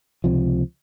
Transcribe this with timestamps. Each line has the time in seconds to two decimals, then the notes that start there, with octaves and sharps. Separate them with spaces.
0.24 C#2 C3 F3